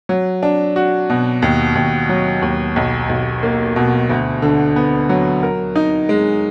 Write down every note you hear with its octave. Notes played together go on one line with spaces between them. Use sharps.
F#3
D4
F#4
B2
D#2
D#2
F#3
D#2
B1
B1
A#3
B2
D2
D3
B3
F#3
A#4
D#4
G#3